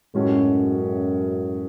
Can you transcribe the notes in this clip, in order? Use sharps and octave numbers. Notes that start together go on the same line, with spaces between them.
F#2 A2 G#3 C#4 F#4 A4